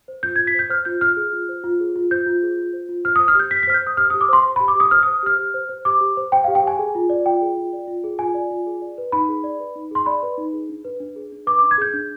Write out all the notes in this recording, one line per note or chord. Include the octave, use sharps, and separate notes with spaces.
C5
F4 G6
G#6
F4
B6
C5 G6
C5 F6
F4 G6
F4 F6
G#4
F4
C5
F4
G#4
F4
C5 G6
F4
G#4
F4
C5
F4
C5 F6
D#6
C5
F6
G4 G6
G4 B6
B6
C5 F6
G6
C5 D#6
G4 F6
D#6
G4
D6
C5 C6
C5
B5
G4
D6
G4 D#6
C5 F6
D#6
C5
G4 F6
G4
C5
C5
G4 D6
G4
C5
C5 G5
F5
G4
G5
G4 G#5
G#4
F4
D5
F4 G5
G#4
F4
D5
F4
G#4
F4 G#5
D5
F4
G#4
D5
B4
D#4 B5
G#4
D5
B4
D#4
G#4 C6
D5 B5
B4
D#4
G#4
D4
B4
D4
G#4
D4
B4 D6
D6
D4
G#6
G#4 G6
D4